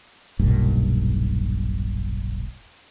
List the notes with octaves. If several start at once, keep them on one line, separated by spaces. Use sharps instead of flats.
E1 B1 G2 A#2